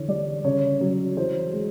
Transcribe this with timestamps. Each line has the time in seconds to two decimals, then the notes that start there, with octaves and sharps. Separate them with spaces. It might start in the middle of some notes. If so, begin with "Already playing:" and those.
Already playing: D3 E3 C#5
0.08 G3 D5
0.44 C#3 C#5
0.81 F#3
1.17 E3 C5
1.53 G#3